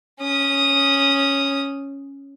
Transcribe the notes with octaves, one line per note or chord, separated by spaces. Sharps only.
C#4 D#6